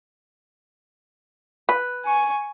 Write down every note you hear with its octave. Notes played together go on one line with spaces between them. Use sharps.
B4
G#5 C#6